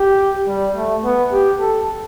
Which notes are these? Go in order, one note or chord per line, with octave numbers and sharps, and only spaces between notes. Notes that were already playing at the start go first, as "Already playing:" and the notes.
Already playing: G4
G3
A3
B3
G4
A4